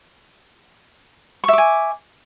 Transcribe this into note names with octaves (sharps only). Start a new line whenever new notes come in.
E5 G#5 C#6 D6